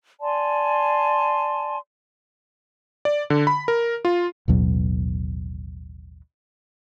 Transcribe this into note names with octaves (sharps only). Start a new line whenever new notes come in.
D5 G#5 A5 C6
D5
D3
B5
A#4
F4
A1 D#2 B2 F#3